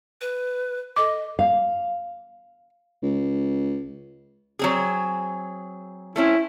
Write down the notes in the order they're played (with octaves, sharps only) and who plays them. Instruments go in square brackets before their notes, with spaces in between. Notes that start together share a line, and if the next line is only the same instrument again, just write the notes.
[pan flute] B4
[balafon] A4 D6 [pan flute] D#5
[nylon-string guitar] F5
[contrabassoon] C#2
[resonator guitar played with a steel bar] F#3 C4 G#4
[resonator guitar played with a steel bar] A3 C4 C#4 [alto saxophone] E4